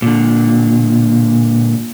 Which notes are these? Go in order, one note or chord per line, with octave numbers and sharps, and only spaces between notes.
A#2 D3